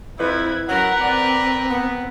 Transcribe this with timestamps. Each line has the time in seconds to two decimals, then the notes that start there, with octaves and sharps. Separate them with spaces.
0.19 F2 E4 B4 G#6
0.69 F#3 C#4 F#4 A#4 B4 F#5
1.01 C4 D5
1.70 B3